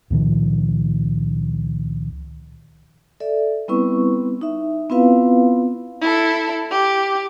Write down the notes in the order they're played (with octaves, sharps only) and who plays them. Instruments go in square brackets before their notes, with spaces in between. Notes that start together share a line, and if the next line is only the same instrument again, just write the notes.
[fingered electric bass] C#2 A#2 D#3 F3
[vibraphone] A4 D5 E5
G3 B3 C4 E4 B4 C#6
D#4 E5
B3 C4 E4 F4 B4 F5
[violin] E4 A4
G4